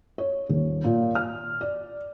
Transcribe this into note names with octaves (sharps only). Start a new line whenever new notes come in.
C#5
D#1
A#2
F6
D5